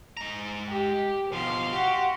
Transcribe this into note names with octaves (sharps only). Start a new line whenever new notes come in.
G#3 A#5
G4
B2 F3 F5 C6
F#4 G4